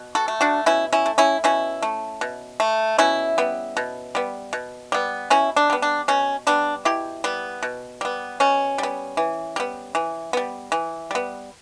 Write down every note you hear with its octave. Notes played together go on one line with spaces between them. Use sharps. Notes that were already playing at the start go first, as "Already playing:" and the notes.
Already playing: B2
F#4 A4
A3
D4 F#4
B2 C#4 E4
C#4 E4
A3
C#4 E4
B2 C#4 E4
A3
B2
A3
B2 C#4 E4
G3 B3
B2
G3 B3
B2
G3 B3
B2 C#4 E4
D4
G3 B3
D4
B2 C#4
G3 B3 D4
B2 E4 G4
G3 B3
B2
G3 B3
B2 C#4
G3 B3
E3
G3 B3
E3
G3 B3
E3
G3 B3